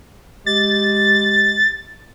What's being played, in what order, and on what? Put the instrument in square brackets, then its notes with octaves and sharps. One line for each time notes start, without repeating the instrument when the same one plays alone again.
[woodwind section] G#3 G4 [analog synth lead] A6